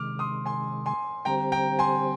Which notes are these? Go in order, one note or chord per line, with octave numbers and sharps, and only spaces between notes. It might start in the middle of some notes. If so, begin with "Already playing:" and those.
Already playing: C3 D#3 G#3 D6 F6
C6 D#6
G#5 C6
G#5 C6
D3 G3 C4 G4 C5 G5 A#5
G5 A#5
G#5 C6